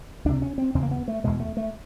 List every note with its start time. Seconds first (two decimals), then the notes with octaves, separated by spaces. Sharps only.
0.25 C#2 C3 D4
0.42 C#4
0.58 C4
0.75 E2 C#3 C4
0.83 A#3
0.91 B3
1.08 A3
1.24 E2 B2 G#3
1.40 A3
1.57 A3